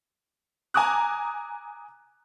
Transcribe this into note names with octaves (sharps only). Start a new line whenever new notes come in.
G#5 A#5 D6 D#6 F#6